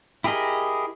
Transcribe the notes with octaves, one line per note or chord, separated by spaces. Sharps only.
E4 G4 G#4 A#4 D#5